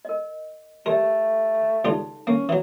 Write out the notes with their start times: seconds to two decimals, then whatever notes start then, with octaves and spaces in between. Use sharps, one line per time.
0.05 A#4 D#5
0.86 A3 G4 A#4 D5
1.85 C#2 G3 D#4 F4 A4
2.27 A#3 C#4
2.49 E3 F#3